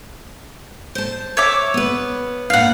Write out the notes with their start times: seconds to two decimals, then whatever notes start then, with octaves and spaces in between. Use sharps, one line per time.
0.95 C5 A5
1.37 C#5 E5 D6
1.74 B3 B4
2.50 G2 A#2 F5 F#5